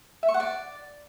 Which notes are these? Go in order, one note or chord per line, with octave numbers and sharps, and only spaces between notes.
E5
C#6
F#5
D5